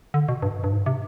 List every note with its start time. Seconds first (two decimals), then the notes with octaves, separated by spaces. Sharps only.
0.14 D3
0.29 B2
0.42 G2
0.64 G2
0.72 G#2
0.86 C3